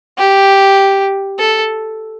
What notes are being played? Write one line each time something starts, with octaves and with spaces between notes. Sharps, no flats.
G4
A4